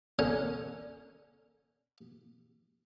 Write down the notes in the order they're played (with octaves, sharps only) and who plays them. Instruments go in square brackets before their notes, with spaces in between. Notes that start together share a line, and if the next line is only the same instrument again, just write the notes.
[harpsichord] D3 C#4 A#4 C#5